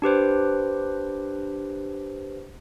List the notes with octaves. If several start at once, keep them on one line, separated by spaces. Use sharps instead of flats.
D4 G4 B4 C5